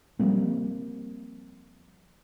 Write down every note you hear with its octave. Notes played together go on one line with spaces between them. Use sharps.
F3 G3 A#3 C4